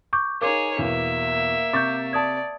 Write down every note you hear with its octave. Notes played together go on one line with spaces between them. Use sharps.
C#6 D6 G6
D#4 G#4 A#4 C#5 F5 D6
E2 B2 A#3 E5
C3 C#6 D6 G6 A6
D5 A5 D#6 G#6